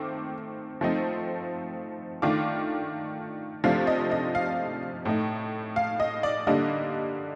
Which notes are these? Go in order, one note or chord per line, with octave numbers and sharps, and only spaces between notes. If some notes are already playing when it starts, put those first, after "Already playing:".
Already playing: D#3 A3 C4 D6
F3 A3 C4 D#4
D#3 A3 D4 F4 D6
C3 F3 A3 D4 F5
D#5
D#5
F5
A2 A3 D#4
F5
D#5
D5
D3 G3 A#3 D4 D#5